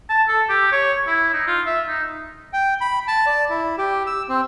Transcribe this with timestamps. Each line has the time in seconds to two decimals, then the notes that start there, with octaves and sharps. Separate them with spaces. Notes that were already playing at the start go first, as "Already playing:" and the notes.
0.10 A5
0.28 A4
0.49 G4
0.72 C#5
1.07 E4
1.33 D#4
1.47 F4
1.66 E5
1.88 D#4
2.53 G5
2.81 B5
3.08 A5
3.26 D5
3.50 E4
3.78 G4
4.07 E6
4.29 C4